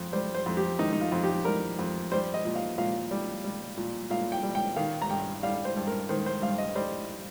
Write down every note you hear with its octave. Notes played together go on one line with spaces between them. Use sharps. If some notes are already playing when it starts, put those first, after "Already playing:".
Already playing: F2
G3 C5
C5
F2
G4
D#3 D#4
D#4
F4
F2
G4
G3 A#4
F2
G3 C5
D#5
A#2
F5
A#2 F5
G3
G3
A#2
A#2 F5
G5
G3
G5
D#3 F5
A#5
G2 G5
G3 F5
C5
G2
A#4
D#3 C5
C5
G2 F5
D#5
G3 C5